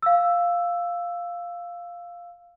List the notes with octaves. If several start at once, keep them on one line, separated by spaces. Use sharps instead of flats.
F5 E6